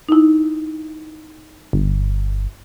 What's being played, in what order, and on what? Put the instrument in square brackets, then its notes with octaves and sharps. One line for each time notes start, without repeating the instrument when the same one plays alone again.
[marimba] D#4 E4
[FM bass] G1